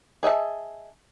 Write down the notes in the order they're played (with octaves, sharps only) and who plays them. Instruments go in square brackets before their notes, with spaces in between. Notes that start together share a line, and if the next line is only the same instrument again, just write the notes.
[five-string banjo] G#4 D#5 E5 A5